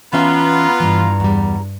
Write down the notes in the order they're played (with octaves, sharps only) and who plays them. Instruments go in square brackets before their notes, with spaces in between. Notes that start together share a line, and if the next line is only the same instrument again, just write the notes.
[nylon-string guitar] E3 C#4 E5 [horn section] B3 F4 [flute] A#5
[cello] G2 [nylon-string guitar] E3
[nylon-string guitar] E2 G3